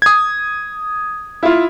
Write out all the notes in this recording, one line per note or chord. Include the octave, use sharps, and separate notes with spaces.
D#6 G#6
E4 F4